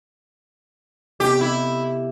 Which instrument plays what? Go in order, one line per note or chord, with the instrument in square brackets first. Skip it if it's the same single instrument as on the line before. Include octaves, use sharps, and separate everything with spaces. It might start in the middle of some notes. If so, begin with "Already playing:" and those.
[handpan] C3 B3 A4 [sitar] G4
[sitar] E4